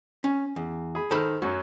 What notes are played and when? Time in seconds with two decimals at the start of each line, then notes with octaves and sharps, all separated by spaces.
0.24 C#4
0.56 E2
0.95 G#4 B5
1.11 D#3 A4 C5 B5 F6
1.42 F#2 F#3 F#4